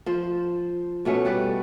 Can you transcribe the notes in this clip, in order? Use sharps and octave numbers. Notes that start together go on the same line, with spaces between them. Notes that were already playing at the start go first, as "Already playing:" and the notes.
F3 C5
B2 A3 B3 C#4
G3 B4 D5